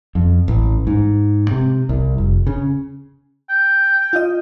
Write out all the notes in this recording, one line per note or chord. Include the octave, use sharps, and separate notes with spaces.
F2
A1
G#2
C3
C2
F1
C#3
G5
F4 D#5